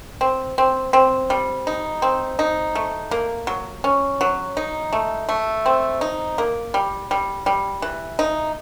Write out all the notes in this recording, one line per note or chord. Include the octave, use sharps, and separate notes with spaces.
C4
C4
C4
G3
D#4
C4
D#4
A3
A#3
F#3
C#4
F#3
D#4
A3
A3
C4
D#4
A#3
G3
G3
G3
E3
D#4